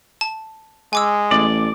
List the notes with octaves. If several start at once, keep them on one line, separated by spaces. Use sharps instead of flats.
A5
G#3 G#5 D6 E6
A1 D5